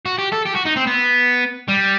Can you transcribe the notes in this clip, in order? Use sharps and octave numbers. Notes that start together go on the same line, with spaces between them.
F#4
G4
A4
G4
F#4
D#4
C4
B3
G3